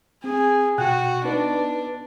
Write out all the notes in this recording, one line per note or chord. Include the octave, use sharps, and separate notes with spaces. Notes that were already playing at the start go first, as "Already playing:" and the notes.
C4 G#4
B2 F#4 G5 F#6
B3 D4 D#4 B4